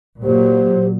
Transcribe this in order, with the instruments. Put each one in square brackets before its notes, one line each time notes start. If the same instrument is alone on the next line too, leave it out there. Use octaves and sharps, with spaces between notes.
[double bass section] A#2 F#3 [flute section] G4 C5